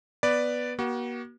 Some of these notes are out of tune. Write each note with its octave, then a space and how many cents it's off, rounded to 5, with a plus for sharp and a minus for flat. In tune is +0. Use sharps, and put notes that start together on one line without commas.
B3 +0 B4 +0 D5 +0
A#3 +45 F#4 +35